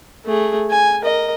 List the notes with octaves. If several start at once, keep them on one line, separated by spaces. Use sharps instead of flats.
A3 G#4
G#5
A#4 D#5